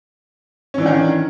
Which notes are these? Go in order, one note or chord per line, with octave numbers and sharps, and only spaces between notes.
D#3 E3 C#4 D4